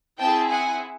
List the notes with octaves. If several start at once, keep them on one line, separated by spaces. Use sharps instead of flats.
C4 E4 G#4 G5 A5
F#5 G#5